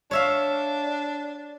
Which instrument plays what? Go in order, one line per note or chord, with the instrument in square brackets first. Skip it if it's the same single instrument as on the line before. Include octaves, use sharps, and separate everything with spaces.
[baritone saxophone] D4 [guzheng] C#5 E5 F5